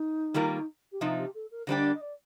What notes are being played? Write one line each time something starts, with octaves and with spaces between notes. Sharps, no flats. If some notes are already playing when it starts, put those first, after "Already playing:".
Already playing: D#4
D#3 G3 A#3 F4 A#4
G4
C3 F3 C4 D#4 F4
G4
A4
A#4
D3 G3 A#3 D4 G4 C5
D#5
D5
D#5
D5